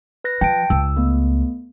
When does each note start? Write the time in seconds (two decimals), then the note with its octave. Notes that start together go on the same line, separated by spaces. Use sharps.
0.24 B4 F#6 A#6
0.41 F3 G5 A5 D7
0.70 C#2 E6
0.96 A3 B3